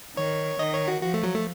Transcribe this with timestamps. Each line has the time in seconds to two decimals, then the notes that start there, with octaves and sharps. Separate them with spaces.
0.16 D#3 C#5
0.59 D#3 D#5
0.73 C#5
0.88 F#4
1.02 F3 F#4
1.14 A3
1.23 F#3
1.34 A3